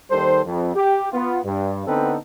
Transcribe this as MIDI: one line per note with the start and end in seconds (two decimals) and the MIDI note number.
0.11 0.41 39
0.11 0.41 51
0.11 0.41 55
0.11 0.41 69
0.11 0.41 72
0.45 0.73 41
0.74 1.06 67
1.12 1.39 59
1.12 1.39 65
1.44 1.86 43
1.87 2.15 50
1.87 2.15 59
1.87 2.15 60
1.87 2.15 63
1.87 2.15 69
1.87 2.15 71